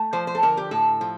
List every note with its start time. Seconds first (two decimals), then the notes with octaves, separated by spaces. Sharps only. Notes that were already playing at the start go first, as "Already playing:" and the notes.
Already playing: A3
0.13 F3 C5
0.27 C5
0.35 A4
0.43 D3 A#4
0.57 G4
0.71 A2 A4
1.01 F3